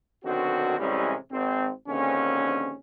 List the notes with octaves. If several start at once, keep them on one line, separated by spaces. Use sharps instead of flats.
B1 D3 D#3 C4 F#4
A1 C3 G3 G#3 C#4 E4
G#1 C4
A#1 D#2 D3 C4 C#4